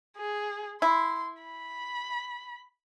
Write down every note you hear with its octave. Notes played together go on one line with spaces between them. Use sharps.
G#4
E4 C6
B5